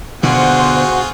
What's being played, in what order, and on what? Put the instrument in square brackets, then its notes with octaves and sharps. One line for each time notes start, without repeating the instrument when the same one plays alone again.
[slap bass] B2 D3 [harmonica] F4 G#4 [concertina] F#4 [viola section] C5 F#5